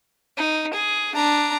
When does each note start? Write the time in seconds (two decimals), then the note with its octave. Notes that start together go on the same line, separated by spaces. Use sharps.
0.37 D#4
0.74 G#4
1.15 D4 A#5